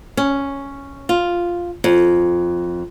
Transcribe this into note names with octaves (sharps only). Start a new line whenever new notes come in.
C#4
F4
F2